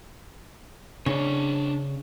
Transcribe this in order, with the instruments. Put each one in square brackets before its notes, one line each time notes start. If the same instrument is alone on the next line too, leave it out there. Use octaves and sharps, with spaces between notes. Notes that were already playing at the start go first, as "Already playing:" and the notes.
[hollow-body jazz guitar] C#3 [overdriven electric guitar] D4 C#5